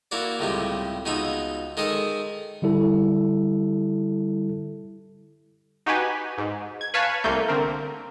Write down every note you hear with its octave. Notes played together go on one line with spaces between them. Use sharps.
A#3 E4 F#4 D5
C#2 A2 C3 G3
C#2 B2 D#4 E5 B5
D#3 G#3 G#4 A4
D3 G3 E4 A4
D#4 F#4 G4 B4 G#5
G#2
G#6
B4 C#5 F5 G#5 A5
C2 G3 A3 A#3 G6
D3 C4 A#4